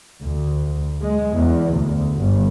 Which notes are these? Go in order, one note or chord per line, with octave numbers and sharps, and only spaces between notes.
D2
G#3
E2
D2
G1